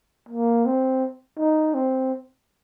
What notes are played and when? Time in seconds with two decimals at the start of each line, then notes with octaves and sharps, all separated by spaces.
0.29 A#3
0.66 C4
1.38 D#4
1.74 C4